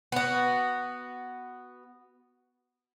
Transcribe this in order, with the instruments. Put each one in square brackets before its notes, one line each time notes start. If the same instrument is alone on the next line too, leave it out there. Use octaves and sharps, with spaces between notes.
[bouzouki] B3 F#4